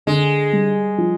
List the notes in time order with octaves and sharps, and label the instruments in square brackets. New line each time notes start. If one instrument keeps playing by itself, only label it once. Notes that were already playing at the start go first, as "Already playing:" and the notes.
[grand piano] D3 [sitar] G#3
[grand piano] G3
F3